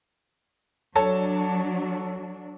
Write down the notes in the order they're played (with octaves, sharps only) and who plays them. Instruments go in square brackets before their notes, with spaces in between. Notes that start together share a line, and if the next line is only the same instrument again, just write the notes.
[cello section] F#3 D4 [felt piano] A4 C#5 A5